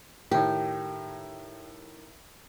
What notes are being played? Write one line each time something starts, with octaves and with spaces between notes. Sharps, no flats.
A2 D#3 G4